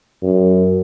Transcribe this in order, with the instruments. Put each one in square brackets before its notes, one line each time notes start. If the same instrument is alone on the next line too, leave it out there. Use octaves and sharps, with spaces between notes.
[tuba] F#2